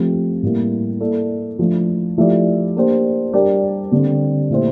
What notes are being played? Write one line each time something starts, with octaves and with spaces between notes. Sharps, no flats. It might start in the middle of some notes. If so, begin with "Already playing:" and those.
Already playing: F3 A3 C4 G4
A2 G3 A#3 E4
A#3 E4 A4 D5
F3 A3 D4
F3 A3 E4 G4 D5
A#3 D4 G4 C5
G3 D4 G4 A#4 D5
D3 G3 C4 G4
A#2 A3 E4 G4 C5